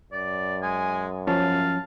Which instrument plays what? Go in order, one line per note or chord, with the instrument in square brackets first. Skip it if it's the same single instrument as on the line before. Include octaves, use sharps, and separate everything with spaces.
[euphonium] F#2 [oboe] D5
[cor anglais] G#3 [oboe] G#5
[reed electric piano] F3 C#4 [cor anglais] F5 [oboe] A5